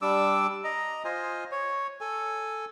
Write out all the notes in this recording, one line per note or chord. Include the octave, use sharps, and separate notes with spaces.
G3 D4 D6 E6
D#5 A#5
F4 C5 D#5 G#5
C#5
A4 G#5